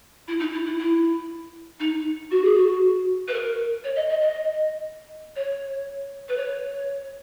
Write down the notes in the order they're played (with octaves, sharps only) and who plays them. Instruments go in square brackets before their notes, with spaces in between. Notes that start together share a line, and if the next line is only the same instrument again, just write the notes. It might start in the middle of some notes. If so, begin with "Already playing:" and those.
[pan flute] E4
D#4
E4
E4
E4
D#4
F#4
G#4
F#4
B4
A#4
C#5
D#5
D#5
D#5
C#5
B4
C#5